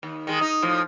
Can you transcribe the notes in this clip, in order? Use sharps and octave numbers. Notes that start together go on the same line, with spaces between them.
D#2
D#3 G#3
D#4
A2 F3